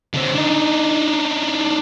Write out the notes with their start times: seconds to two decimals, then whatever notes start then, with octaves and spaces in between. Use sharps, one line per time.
0.14 D3 C4
0.35 D4 D#4